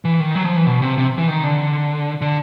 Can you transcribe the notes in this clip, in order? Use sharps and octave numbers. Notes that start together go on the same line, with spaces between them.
E3
D#3
F#3
F3
E3
B2
C3
C3
E3
D#3
D3
D3